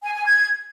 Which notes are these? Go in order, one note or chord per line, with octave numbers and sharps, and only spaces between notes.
G#5
G#5
G#6